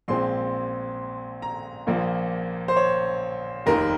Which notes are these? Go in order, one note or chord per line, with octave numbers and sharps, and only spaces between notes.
A#1 A#2 G#3 C4 C6
A#5
A#1 A#2 F3 A#3
C5
C#5
F1 D#2 D#3 A#4